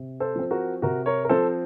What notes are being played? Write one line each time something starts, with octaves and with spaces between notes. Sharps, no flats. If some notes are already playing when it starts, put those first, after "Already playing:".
Already playing: C3
A4 C5
F3 C4
F#4 A#4
C3 F#4 A#4
A#4 C#5
A#4
F3 C4 A4 C5